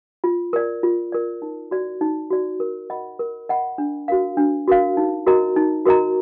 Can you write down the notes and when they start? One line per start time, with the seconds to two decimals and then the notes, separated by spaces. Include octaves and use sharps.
0.24 F4
0.53 A#4 D5
0.83 F4
1.12 A#4 D5
1.42 D#4
1.71 F#4 D5
2.01 D#4
2.31 F#4 D5
2.60 A#4
2.90 D#5 F#5 B5
3.19 A#4
3.49 D#5 F#5 B5
3.78 D4
4.08 F#4 A#4 F5
4.37 D4
4.68 F#4 A#4 F5
4.97 D#4
5.27 F#4 A#4 D#5 A#5
5.56 D#4
5.85 F#4 A#4 D#5 A#5